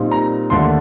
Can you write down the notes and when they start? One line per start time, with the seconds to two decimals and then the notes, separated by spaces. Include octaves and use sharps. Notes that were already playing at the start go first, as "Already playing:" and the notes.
Already playing: A#2 G3 C4 D#4
0.12 A#5
0.50 D#2 D3 A3 D4 C6